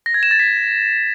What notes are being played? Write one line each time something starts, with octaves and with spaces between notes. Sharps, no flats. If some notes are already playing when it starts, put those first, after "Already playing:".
A#6
G#6
E7
A6
B6